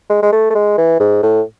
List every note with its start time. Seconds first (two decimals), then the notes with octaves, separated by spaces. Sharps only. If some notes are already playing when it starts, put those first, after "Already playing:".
0.10 G#3
0.22 G#3
0.32 A3
0.50 A3
0.55 G#3
0.78 E3
1.00 G#2
1.23 A2